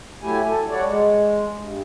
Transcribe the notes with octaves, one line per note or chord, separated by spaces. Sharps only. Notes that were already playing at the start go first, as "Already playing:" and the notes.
F#3 A3 E4 G4 G#5
A4
G3 F#4 C#5 D5
G#3
G2